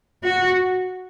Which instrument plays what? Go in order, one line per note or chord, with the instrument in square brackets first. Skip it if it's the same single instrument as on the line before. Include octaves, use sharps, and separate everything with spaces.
[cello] F#4